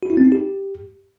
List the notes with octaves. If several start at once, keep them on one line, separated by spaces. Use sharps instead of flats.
F#4
E4
C4
D#4
G4